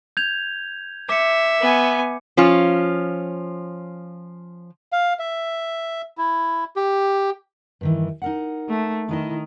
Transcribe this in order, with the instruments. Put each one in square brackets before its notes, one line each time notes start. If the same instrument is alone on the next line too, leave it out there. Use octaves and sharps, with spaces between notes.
[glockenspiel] G6 G#6 F7
[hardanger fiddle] E5 [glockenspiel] D6 C#7
[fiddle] B3 G#5
[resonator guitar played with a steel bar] F3 C#4 F4
[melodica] F5
E5
E4
G4
[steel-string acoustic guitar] G2 D#3 E3
D#4 A#4 F#5
[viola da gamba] A3
[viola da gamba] D#3 [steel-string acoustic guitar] E4 B4 D#5